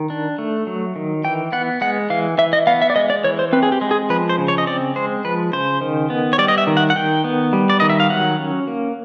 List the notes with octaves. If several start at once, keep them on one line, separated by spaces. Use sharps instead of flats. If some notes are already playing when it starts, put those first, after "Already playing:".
Already playing: D#3
D4
A3
F#3
D#3
E3 G5
B3 F#5
G#3 F#5
E3 F5
E3 E5
D#5
B3 F5
E5
D5
G#3 D#5
D5
E3 C#5
C5
C4 B4
G#4
G4
G#3
G#4
F3 B4
C5
C#3
C#5
D#5
C4 D5
G#3 C5
F3 B4
C#3 C5
D#3
B3
C#5
G3 D5
D#5
E5
D#3
F#5
F#5
D#3 G5
B3
G3
D5
D#3 D#5
E5
F5
F#3 F#5
C#4
A#3